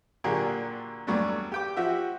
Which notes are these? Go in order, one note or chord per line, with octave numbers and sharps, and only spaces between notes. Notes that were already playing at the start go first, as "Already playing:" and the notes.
A#2 D3 F#3 G4 G#4 A#4
E2 G2 F#3 A3 D4
G4 G5 D6
F3 F#4 G4 E5